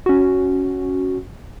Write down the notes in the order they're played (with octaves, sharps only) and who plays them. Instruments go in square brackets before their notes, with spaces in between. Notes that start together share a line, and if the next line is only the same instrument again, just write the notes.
[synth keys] C#4 F#4